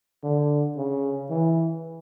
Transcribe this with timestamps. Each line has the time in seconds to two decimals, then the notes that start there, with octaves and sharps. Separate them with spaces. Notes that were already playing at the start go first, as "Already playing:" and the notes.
0.23 D3
0.76 C#3
1.30 E3